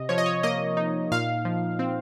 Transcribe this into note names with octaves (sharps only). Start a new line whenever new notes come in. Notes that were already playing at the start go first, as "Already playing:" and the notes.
Already playing: C3 D#5
F3 C#5
D#5
C#5
A#3 D#5
D#4
A#2 F5
F3
C4